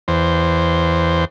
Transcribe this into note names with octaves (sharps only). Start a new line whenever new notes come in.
E2 C5